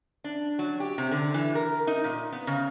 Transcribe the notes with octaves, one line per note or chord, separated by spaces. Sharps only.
D4
F#3
G4
C3
D3
E3
A#4
D#4
A#2
B3
C#3